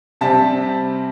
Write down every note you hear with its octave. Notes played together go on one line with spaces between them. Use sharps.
C3 G3 C4 A5